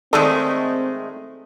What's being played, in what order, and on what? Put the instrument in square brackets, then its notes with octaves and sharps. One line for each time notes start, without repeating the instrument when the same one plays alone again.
[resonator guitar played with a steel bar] D#3 G#3 A3 [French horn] C4 [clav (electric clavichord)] A4 [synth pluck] D5 C6